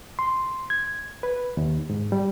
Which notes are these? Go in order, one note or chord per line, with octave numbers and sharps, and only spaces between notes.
C6
G#6
B4
D#2
G#2
G3